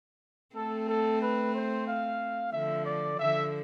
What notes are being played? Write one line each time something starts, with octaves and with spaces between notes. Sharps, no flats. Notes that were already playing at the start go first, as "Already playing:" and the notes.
A3 C4 A4
A4
B4
C5
F5
D3 F3 E5
D5
D3 F3 E5